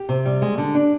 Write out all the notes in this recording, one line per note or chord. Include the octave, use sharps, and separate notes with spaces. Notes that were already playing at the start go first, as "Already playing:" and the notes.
Already playing: G4
C3
G3
G#3
D3
D4